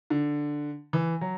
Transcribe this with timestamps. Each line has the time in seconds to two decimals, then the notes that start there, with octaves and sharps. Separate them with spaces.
0.10 D3
0.93 E3
1.21 F#3